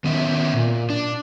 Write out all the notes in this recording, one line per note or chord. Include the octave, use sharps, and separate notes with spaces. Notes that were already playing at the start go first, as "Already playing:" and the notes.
D#3 B3 C#4 D5 E5
A#2
D4